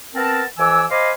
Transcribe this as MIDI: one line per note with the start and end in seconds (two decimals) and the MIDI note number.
0.15 0.43 59
0.15 0.43 60
0.15 0.43 70
0.15 0.43 81
0.58 0.84 41
0.58 0.84 52
0.58 0.84 80
0.58 0.84 86
0.58 0.84 88
0.90 1.11 72
0.90 1.11 75
0.90 1.11 77
0.90 1.11 80
0.90 1.11 83
0.90 1.11 86